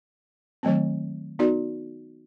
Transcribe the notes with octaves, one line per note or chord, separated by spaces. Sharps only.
D#3 F#3 A3 C4
B3 D#4 F#4 A#4 D5